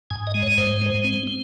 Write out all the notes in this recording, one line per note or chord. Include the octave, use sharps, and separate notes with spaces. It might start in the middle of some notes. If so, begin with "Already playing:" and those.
G#2 G#5
D#5
G#3
C#5
G#2 C5
G#3
C4
C4